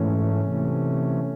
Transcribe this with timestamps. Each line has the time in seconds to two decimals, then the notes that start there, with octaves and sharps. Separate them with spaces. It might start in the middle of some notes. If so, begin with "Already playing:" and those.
Already playing: G#2 E3 A3 C#4
0.41 C3 E3 A3 C#4